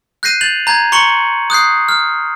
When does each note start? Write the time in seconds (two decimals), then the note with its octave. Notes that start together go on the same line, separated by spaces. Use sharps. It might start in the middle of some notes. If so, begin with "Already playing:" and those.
0.23 F#6 G6 A#6 C7 D#7
0.41 G6 A6 F7 F#7
0.67 A#5 G6 G#6
0.92 A#5 C6 C#6 C#7 F#7
1.50 D#6 F#6 G6 C7
1.89 F6